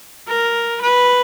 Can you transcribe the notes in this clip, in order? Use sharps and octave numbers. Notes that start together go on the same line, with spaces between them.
A#4
B4